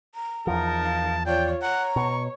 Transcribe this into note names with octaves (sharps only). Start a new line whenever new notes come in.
A#5
E2 F3 D#4 A#4 A5
F5
F4 C#5 D5 G5
C#5 F#5 A#5
B2 C#6